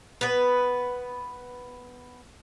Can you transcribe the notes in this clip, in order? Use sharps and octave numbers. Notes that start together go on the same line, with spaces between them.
B3 B4